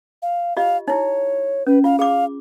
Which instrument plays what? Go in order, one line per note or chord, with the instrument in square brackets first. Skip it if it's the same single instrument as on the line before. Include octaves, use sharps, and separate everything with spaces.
[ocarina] F5
[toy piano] F4 G4 D#5 [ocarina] F5
[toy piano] D#4 E4 [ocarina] C#5
[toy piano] C#4 [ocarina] B4
[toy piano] F4 [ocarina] F5
[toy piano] G#4 D6 [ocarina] F5